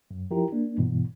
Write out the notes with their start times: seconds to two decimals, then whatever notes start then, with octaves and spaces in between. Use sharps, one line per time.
0.11 F#2
0.31 F3 E4 G4 A#4
0.52 A#3 D4
0.78 G2 B2 E3